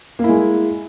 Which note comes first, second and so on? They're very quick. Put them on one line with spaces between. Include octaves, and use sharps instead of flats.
A#3 E4 G#3